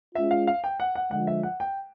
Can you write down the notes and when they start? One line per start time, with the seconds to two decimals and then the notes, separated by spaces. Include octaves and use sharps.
0.15 G#3 C#4 F4 E5
0.31 F5
0.47 F5
0.64 G5
0.80 F#5
0.96 F#5
1.11 D3 F3 G#3 F#5
1.27 E5
1.43 F#5
1.60 G5